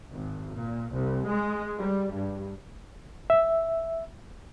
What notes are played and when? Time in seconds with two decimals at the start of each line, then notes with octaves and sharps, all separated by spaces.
0.11 G#1
0.54 A#2
0.92 C2
1.27 G#3
1.77 G3
2.13 G2
3.30 E5